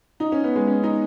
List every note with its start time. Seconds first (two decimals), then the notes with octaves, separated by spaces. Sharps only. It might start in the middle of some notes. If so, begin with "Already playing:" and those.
0.20 D#4
0.32 C#4
0.44 B3
0.56 G#3
0.67 C#4
0.84 D#4